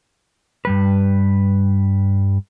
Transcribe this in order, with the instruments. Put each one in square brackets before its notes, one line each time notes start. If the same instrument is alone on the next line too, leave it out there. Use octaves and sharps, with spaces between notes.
[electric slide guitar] G2 G3 B4